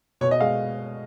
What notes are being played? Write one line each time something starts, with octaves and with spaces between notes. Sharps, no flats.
B2 C#5
D#5
G#3 F5